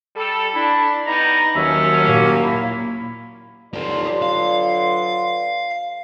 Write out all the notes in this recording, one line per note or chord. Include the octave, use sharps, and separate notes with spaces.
G3 A4
D4 E4
G3 B3 D#4 A#5
D#2 F3 F#3 C#4 E5
A#2 A#3
E4
D3 F#3 F4 G4 A#4 B4 D5 C6
F5